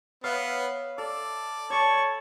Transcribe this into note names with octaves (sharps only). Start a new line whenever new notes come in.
B3 C#5 E5 F5
A4 D5
C#5 A5 B5 C#6